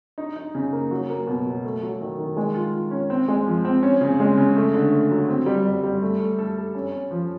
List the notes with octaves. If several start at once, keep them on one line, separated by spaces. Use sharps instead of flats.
D#4
D#4
C#3
A#3
F#3
A#3
B2
F#3
A3
F#3
D#3
D#3
G#3
F4
F4
C#4
C4
G#3
F3
C4
C#4
C#3
G#3
C#3
A3
D3
A3
F#3
C4
G3
G3
G3
A3
A3
A4
A4
C#4
C#4
F3